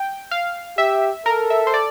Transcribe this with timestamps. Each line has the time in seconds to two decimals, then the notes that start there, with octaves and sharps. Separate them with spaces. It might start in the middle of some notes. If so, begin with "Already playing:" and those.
Already playing: G5
0.31 F5
0.78 G4 E5
1.26 A4 A#4
1.50 E5
1.67 C5
1.74 D5